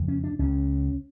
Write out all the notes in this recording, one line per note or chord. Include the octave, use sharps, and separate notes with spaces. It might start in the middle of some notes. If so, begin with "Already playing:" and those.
Already playing: F2 C#3
C#4
D4
C#2 C#3 C#4